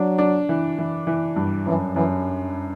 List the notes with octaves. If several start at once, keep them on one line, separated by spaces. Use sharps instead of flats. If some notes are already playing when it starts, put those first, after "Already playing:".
Already playing: F#3 D4
D4
E3
E3
E3
G2
F#2 E3
F#2 E3